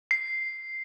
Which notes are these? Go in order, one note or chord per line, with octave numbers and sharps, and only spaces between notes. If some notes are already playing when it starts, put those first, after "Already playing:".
C7